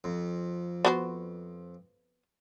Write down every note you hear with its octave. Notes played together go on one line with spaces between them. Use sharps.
F2
B3 F#4 C5